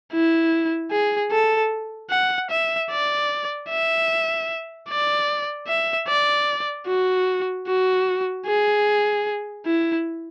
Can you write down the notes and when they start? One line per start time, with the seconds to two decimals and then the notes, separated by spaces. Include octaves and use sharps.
0.13 E4
0.91 G#4
1.31 A4
2.11 F#5
2.50 E5
2.91 D5
3.70 E5
4.89 D5
5.68 E5
6.08 D5
6.87 F#4
7.67 F#4
8.46 G#4
9.66 E4